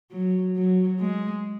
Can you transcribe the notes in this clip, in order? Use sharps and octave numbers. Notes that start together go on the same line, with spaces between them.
F#3
F#3
G#3